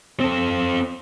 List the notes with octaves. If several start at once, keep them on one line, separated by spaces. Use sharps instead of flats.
C4 A4